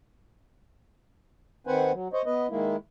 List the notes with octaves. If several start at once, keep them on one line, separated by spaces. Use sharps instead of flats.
D#3 C4 B4 C5 F#5 G#5
F#3
C5 C#5 D#5
B3 B4 D#5
D#3 G#3 A#3 E4